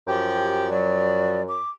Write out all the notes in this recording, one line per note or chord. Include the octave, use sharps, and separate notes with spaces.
F#2 F3 G4
F3 F#3 D5
D6